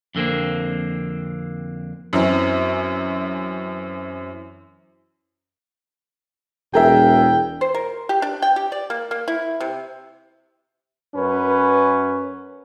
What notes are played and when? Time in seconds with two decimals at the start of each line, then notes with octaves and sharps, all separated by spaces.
0.15 F2 D3 A#3 C4
2.13 F#2 E3 C4 C#4
6.74 E1 G#4 A#4 E5 G5
7.61 C5
7.75 A#4
8.09 G4
8.22 D4
8.42 G5
8.56 G4
8.72 D5
8.90 A#3
9.11 A#3
9.28 E4
9.60 C3
11.15 F#2 C#4 B4